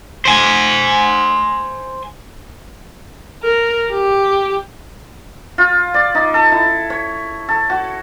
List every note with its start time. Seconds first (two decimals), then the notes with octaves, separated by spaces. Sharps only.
0.25 C5 G#5
3.43 A#4
3.91 G4
5.58 F4
5.94 D5
6.15 D#4
6.34 A4
6.52 E4
6.90 C#5
7.48 A4
7.70 F#4